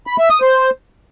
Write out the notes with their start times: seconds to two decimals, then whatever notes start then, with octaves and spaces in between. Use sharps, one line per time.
0.07 B5
0.18 E5
0.30 D#6
0.41 C5